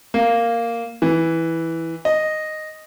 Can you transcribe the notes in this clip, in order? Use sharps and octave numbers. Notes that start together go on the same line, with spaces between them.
A#3
E3
D#5